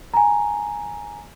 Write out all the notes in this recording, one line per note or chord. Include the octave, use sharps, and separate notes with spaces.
G#5 A#5